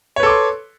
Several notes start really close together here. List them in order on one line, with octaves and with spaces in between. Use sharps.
C#5 B4 A4 D6 C6